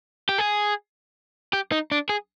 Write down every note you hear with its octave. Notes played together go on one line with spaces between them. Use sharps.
G4
G#4
G4
D#4
D4
G#4